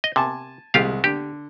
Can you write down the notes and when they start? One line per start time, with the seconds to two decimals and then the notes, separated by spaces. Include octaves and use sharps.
0.04 D#5
0.16 C3 G#5 A5
0.74 C2 G#3 F4 G4 F5
1.04 D3 G4